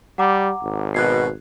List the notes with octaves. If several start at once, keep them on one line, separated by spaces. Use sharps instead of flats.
G3 F#5 A#5 D6
G#1
B2 F#6 G#6 C7